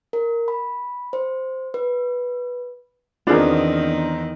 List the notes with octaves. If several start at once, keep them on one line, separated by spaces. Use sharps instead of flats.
A#4
B5
C5
B4
E2 D#3 B3 C4 D4 F4 G#4 A#4